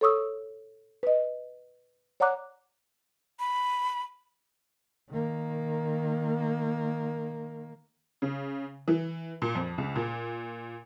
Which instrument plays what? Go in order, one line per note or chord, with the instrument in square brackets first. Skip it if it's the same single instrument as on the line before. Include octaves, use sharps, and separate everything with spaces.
[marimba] A4 C#5 C#6 D#6 E6
B4 D#5
C#5 D5 F#5 A#5 D6 F#6
[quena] B5
[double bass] D#3 A#3
[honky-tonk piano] C#3
E3
A#2
F2
C#2
A#2